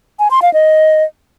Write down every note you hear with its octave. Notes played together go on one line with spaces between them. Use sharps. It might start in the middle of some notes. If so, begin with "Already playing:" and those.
G#5
C6
F5
D#5